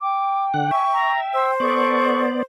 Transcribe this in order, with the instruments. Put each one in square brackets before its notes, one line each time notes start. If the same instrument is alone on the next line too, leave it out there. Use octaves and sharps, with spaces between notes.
[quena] G5 [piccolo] D6
[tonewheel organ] D3 F#5
[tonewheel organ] E5 [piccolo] G#5 [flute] C#6
[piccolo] A#5
[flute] C5 [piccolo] E6
[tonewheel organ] B3 D5 [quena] A4 [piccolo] C#6